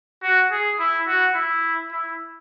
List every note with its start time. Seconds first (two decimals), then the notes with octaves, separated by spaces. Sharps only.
0.23 F#4
0.51 G#4
0.79 E4
1.07 F#4
1.35 E4
1.92 E4